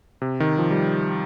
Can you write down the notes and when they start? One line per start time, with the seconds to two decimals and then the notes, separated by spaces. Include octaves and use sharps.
0.22 C3
0.40 D#3
0.58 F3
0.71 G3